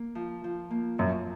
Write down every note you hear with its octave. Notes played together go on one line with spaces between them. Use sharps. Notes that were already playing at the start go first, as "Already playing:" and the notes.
Already playing: A#3
F3
F3
A#3
F#2 F3